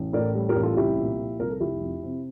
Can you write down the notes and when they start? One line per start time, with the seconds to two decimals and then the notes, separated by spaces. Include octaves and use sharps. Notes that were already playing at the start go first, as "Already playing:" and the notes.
Already playing: A1
0.13 A2 A#4 D5
0.34 G3
0.49 G4 A#4
0.55 A1
0.63 F4 A4
0.76 C2 E4 G4
0.98 A#2
1.18 F3
1.39 C2 A#4
1.50 A4
1.60 F1 E4 G4
1.81 F2
2.03 C3